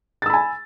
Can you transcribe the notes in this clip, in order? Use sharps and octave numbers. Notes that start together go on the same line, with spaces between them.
G#5 B5 E6 A6